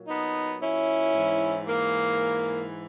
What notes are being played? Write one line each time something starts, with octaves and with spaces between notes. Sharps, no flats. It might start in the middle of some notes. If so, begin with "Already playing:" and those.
Already playing: A#2 F#3
B3 D#4
C#4 E4
G#2 E3
A#3